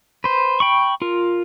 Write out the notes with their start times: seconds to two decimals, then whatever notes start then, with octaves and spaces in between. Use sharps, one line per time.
0.24 B4 C5
0.60 G5 B5 C#6
1.02 F4 A#4